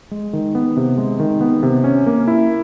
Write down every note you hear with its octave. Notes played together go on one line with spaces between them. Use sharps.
G#3
D#3
B3
C3
G#3
D#3
B3
C3
C#4
A#3
E4